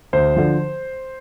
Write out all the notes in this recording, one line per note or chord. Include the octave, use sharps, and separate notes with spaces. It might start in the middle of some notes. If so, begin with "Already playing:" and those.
D2 C5
D3 F3